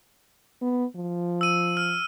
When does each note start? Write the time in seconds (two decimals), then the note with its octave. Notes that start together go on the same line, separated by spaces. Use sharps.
0.62 B3
0.96 F3
1.41 E6 D#7
1.77 F6